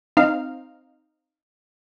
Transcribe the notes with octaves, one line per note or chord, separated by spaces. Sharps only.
C4 D#4 F5